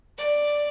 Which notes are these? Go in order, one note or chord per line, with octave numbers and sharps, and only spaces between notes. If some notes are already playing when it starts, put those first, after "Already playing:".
D5